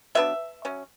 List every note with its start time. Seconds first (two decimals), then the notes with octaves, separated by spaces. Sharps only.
0.15 F#3 B3 D4 E5
0.65 F#3 C#4